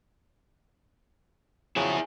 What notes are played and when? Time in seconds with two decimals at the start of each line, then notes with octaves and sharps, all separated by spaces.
1.76 C#3 F3 F#3 E4 G#4